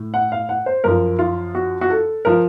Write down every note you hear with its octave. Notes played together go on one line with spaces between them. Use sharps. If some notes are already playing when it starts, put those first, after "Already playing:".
Already playing: A2
F#5
F5
F#5
C5
F#2 F3 A#4
F4
F#4
F#4
A4
F3 A#4